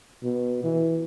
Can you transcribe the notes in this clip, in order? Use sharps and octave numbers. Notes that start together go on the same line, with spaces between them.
B2
E3